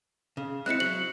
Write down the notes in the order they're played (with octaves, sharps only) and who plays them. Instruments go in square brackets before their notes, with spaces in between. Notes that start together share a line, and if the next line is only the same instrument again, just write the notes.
[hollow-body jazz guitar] C#3
[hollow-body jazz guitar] G#3 C4 E4 [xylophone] F#6 C#7
[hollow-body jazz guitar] F#3 [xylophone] F#7